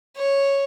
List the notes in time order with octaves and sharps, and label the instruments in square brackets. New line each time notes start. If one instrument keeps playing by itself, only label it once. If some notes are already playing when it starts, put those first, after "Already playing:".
[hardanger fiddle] C#5